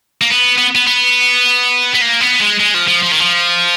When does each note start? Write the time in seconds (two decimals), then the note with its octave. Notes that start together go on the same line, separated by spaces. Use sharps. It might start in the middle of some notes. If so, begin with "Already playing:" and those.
0.21 A#3
0.30 B3
0.58 B3
0.75 B3
0.87 B3
1.95 B3
2.02 A#3
2.21 B3
2.40 G#3
2.59 G#3
2.74 F3
2.88 F3
3.03 F3
3.12 D#3
3.21 F3